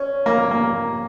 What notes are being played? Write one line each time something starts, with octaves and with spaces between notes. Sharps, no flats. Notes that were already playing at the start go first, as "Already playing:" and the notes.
Already playing: C#4
A#3
A#3